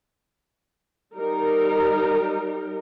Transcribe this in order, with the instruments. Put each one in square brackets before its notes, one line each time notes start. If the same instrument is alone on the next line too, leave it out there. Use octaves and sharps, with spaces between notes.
[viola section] G3 D#4 A#4